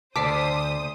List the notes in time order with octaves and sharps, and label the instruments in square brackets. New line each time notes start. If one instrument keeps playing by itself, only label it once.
[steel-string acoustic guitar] D2 [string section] C5 D#6 [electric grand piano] A5 [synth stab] D6 B6 C7